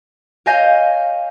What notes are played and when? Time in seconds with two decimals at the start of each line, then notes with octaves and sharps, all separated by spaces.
0.46 C#5 D#5 F5 G#5 G6 A#6